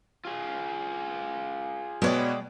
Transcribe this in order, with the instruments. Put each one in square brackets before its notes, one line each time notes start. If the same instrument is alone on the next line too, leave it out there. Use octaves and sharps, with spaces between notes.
[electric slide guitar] F4 G#4
[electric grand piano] B2 B3 C#5 [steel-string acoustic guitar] G#3 D5 G5